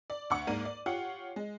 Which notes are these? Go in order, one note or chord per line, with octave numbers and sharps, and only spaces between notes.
D5
D2 F#5 C#6
G#2 A#3 A#4 D5 D#7
D5
F4 G4 C#5 F#5
G#3